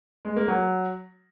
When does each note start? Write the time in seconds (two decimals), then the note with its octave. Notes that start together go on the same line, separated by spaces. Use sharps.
0.25 G#3
0.36 A#3
0.48 F#3